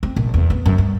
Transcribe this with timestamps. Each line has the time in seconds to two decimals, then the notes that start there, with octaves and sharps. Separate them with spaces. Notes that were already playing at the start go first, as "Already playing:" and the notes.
0.03 C4
0.16 A#1
0.34 E2
0.50 B3
0.66 F#2
0.78 G2